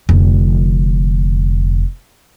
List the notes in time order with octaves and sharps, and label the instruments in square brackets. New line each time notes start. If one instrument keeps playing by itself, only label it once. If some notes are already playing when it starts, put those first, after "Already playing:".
[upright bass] F1 D3